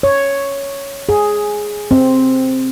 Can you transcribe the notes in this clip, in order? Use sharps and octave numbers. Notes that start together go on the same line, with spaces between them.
C#5
G#4
C4